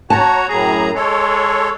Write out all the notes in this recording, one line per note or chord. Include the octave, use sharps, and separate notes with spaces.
F#4 C#5 A5 A#5
F#2 A2 G#4 A#5
G#3 A4 C#5